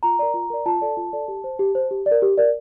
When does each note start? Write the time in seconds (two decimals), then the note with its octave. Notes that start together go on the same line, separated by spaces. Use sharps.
0.03 F4 A#5
0.19 A#4 D5
0.34 F4
0.50 A#4 D5
0.66 F4 A5
0.81 A4 D5
0.97 F4
1.13 A4 D5
1.28 G4
1.44 C5
1.59 G4
1.75 C5
1.91 G4
2.06 D5
2.11 A#4
2.22 G4
2.38 A#4 D5